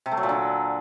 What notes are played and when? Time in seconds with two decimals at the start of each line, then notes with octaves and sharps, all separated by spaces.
0.06 C3
0.11 A3
0.17 F#3
0.23 A#2
0.29 D3